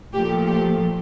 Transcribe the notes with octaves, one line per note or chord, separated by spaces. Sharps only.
A#2 F3 A3 G4
G4